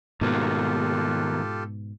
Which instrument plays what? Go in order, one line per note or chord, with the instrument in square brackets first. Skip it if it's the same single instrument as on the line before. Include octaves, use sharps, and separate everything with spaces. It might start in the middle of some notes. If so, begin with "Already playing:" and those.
[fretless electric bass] G#2 B2 [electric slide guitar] D#3 A#3 B3 [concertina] F4 G4 A4